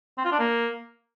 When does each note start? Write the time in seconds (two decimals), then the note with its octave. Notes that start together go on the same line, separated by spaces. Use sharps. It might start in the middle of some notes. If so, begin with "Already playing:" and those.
0.18 C4
0.25 F4
0.32 D4
0.39 A#3